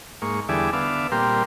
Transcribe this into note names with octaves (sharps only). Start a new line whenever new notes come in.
G#2 A#3 C#6
E2 D3 G3 G#4 E5 D6
D3 B3 E5 F5 D6
A#2 G3 C4 G4 A#4 C6